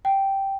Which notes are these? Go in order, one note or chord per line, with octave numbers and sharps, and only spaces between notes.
G5